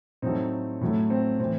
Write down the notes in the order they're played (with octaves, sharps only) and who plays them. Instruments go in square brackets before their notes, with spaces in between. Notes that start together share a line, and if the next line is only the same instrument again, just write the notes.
[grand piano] A2 F#3 A3 C4 D#4
A2 F#3 A3
C4
A2 E3 C4